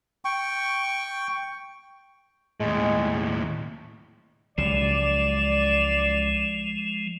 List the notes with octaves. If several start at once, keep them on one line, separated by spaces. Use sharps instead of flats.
G5 C#6
D#2 A2 G#3
C#2 F3 F#3 G#3 D5 E7